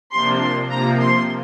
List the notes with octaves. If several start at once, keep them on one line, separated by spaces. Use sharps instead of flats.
C3 F3 A#3 D4 C6
C6
C3 F3 A#3 A#5
C6